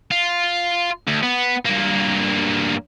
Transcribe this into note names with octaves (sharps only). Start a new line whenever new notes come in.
F4
D2
B3
G2 A#3